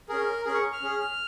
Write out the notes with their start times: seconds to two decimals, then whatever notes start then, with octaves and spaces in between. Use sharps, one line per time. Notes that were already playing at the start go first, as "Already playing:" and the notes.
0.09 C#4 G#4 A#4
0.45 C#4 G#4 A#4
0.54 C#6
0.73 F6
0.82 C#4 G#4